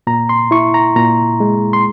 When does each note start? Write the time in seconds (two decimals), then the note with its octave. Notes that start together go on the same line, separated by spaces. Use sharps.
0.07 A#2 A#5
0.29 C6
0.51 E4 C#6
0.74 A#5
0.96 A#2 A#5
1.40 G#3
1.73 C6